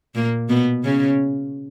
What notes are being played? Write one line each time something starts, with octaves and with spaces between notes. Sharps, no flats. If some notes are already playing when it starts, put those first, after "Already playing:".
A#2 A#3
B2 B3
C#3 C#4